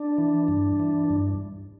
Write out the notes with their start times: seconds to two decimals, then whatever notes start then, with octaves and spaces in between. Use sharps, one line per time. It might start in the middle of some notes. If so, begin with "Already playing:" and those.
Already playing: D4
0.18 E3
0.48 G2
0.80 E3
1.10 G2